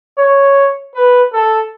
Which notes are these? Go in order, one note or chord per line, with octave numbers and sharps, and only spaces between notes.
C#5
B4
A4